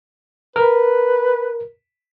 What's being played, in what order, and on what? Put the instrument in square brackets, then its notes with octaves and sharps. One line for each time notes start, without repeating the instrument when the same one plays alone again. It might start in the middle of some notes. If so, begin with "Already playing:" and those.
[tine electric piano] A#4 [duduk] B4